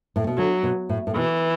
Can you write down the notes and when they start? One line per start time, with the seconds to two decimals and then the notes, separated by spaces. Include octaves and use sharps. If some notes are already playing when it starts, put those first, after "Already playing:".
0.16 A2
0.27 B2
0.37 D3 F#3
0.63 B2
0.89 A2
1.07 A2
1.15 B2 E3